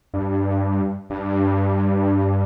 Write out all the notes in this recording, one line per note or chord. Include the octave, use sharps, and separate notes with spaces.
G2
G2